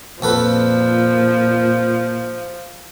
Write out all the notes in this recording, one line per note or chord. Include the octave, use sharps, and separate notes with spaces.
F2 A#2 F3 A4 B4